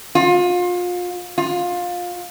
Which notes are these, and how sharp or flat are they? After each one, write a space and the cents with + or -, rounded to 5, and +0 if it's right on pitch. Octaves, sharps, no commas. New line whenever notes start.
F4 +30
F4 +20